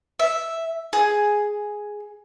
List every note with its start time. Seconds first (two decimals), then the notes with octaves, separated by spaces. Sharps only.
0.19 E5
0.93 G#4